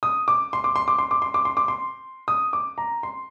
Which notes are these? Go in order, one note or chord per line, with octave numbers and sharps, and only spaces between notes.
D#6
D6
C6
D6
C6
D6
C6
D6
C6
D6
C6
D6
C6
D#6
D6
A#5
C6